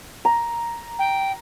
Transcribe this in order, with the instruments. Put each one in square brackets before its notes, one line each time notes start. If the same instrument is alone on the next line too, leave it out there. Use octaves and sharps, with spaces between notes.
[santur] A#5
[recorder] G5